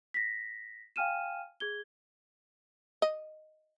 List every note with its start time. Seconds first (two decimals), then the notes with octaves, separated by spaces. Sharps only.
0.14 A#6 B6
0.96 F5 G5 G#5 F6 D#7 E7
1.60 G#4 G#6 G7
3.02 D#5